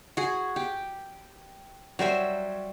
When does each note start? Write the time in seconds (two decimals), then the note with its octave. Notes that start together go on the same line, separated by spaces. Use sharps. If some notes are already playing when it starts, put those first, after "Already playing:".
0.17 F#4 G#4
0.56 G4
1.99 F#3 G3 C5 E5